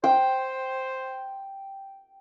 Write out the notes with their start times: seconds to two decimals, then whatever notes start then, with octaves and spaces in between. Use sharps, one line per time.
0.04 C5 G5